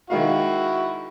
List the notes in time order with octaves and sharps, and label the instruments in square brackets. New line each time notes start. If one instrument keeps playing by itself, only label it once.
[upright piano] D#3 G#3 F5 [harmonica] E4 F#4